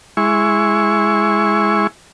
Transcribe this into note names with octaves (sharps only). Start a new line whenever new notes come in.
G#3 E4 C#6